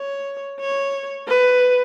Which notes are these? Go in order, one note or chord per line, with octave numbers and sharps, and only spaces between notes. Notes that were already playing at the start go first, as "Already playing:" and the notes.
Already playing: C#5
C#5
B4